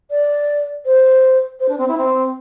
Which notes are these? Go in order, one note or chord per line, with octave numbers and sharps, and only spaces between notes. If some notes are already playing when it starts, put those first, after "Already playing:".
D5
C5
C5
D4
C4
E4
C4